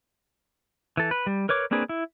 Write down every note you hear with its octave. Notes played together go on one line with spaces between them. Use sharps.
E3 A4
B4
G3
A#4 B4 C#5 D6
A#3 C4 D4 G#4 B4
E4